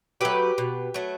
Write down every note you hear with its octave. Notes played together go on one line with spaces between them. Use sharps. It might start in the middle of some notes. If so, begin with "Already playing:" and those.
F#3 A3 G4 B4
B2
F#3 A3